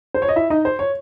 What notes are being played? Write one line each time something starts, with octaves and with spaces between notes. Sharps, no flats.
C5
C#5
D#5
E4 E5
D#4 D#5
C5
C#5